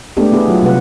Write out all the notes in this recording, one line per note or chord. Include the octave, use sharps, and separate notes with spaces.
G#3 A3 B3 D4 G4
B3 E4 G#4
F#3 F4
C3 G3 B4 F#5